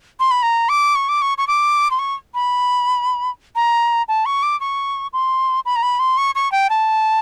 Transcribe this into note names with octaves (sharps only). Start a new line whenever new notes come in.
C6
B5
A#5
D6
C#6
D6
C#6
C#6
D6
C6
C#6
B5
A#5
A5
C#6
D6
C#6
C6
B5
A#5
B5
C6
C#6
C#6
G5
A5